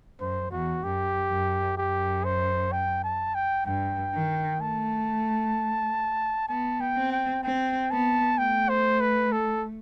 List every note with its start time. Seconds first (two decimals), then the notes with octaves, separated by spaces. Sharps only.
0.20 F#2 C5
0.52 E2 F#4
0.83 F#2 G4
1.30 F#2
1.77 F#2 G4
2.25 C5
2.72 G5
3.04 A5
3.35 G5
3.66 G2 G5
4.14 D#3
4.60 A3 A5
6.49 B3 A5
6.81 G5
6.97 C4
7.12 G5
7.43 C4 G5
7.91 B3 A5
8.38 A3 G5
8.69 C5
9.01 B4
9.32 A4